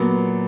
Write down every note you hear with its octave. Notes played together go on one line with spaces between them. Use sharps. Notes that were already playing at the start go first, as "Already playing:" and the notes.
Already playing: A#2 F#3 B3